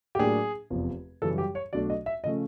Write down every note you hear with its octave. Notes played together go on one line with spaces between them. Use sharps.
G4
A2 F#3 A#3 D4 G#4
F1 E2 C3 F3
F#2 C#3 E3 G3 A4
G4
C#5
B1 B2 F#3 A3 D4 D5
D#5
E5
C#3 F3 A3 C#4 D#5